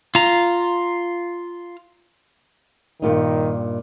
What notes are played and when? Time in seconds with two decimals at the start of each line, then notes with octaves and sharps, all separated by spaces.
0.15 F4 A#5
3.02 G2 A#2 D#3 D#4